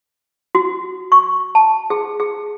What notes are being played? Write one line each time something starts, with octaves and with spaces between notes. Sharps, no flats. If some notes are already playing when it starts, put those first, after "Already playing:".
F#4
C#6
A5
G#4
G#4